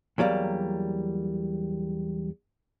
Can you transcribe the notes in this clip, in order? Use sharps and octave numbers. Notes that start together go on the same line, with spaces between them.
E2 F#3 G3 A#3